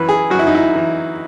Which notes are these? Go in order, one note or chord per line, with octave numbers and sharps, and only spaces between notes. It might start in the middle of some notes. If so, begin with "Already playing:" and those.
Already playing: F#2 E3 B4
G#4
F#2 F#4
E4
D#4
E4
E3